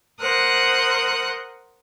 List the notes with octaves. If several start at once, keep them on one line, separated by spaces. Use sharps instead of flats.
A#4 C5 F#5 D#6 F#6